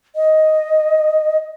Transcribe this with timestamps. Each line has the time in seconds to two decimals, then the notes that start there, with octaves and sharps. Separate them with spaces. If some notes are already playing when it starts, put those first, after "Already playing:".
0.16 D#5